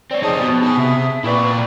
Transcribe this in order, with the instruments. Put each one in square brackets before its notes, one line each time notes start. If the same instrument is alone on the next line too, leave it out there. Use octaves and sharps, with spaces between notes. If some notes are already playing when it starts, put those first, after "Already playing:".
[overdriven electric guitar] C4 C#4 [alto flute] D5
[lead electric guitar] F2 D#4 [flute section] G4 A5 [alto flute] G#4
[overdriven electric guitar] B2
[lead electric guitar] D#4 G#5
[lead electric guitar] C3 [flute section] E5
[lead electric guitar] A#2 [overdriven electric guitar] E4 D5 [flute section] B4 B5 C#6 [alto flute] G5